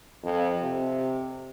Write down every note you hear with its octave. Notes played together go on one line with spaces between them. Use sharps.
F2
C3